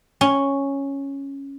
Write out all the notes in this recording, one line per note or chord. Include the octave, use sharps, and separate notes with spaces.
C#4